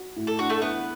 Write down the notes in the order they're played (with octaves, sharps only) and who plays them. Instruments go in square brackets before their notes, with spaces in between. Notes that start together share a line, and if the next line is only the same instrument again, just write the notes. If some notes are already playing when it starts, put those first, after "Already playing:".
Already playing: [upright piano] F#4
A2
[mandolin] A4
[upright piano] D4 [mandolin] F#4
[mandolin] A3 A4
[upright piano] E2 [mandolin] B3 B4